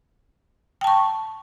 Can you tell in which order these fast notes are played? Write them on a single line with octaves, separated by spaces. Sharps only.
G5 A5 C#6